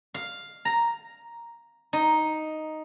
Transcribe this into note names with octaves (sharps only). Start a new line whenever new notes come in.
F5
A#5
D#4